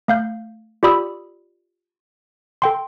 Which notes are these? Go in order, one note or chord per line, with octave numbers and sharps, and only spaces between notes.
A3 F5 G6
F4 G4 D5 B5 D#6 E6
A4 G5 C6